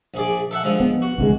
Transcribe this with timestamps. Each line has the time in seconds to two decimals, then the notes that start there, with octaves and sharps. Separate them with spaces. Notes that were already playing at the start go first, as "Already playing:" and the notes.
0.14 A#1 G#4 D5
0.51 A4 E5 F#5
0.63 D3 F3 G#3
0.80 B3
1.02 F#4
1.18 C2 D3 G#3